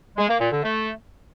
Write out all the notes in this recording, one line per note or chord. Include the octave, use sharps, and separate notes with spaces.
G#3
A#3
A#2
D3
A3